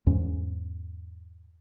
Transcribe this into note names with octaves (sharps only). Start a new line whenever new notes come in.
E2 G#2 C#4